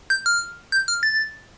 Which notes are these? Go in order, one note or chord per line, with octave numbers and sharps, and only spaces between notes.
G6
F6
G6
F6
A6